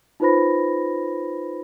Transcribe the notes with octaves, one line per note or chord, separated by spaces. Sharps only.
D#4 F4 B4 C5 B5 A#6